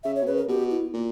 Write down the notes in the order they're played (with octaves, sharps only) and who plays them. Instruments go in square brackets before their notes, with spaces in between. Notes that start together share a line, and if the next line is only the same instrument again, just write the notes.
[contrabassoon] C#3 [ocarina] E5
[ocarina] C#5
[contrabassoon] B2
[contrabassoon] C#3 [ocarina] B4
[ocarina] A#4
[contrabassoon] B2 [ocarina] G4
[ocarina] E4
[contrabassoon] A#2